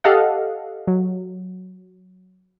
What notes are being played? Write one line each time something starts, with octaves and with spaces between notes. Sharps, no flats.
G4 A4 D#5 F5 F#5
F#3